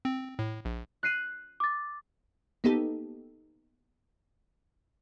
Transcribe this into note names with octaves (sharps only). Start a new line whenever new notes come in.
C4
A2
A#1
F#6 C7 D#7
D6 A6
A#3 B3 D#4 G4 A4